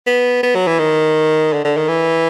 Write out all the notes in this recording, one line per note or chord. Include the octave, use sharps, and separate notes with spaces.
B3
B3
F#3
E3
D#3
D3
D3
D#3
E3